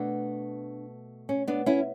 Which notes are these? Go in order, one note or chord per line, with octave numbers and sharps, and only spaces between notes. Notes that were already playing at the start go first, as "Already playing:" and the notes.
Already playing: B2 A3 B3 D4
C#4
B3 D4
C#4 E4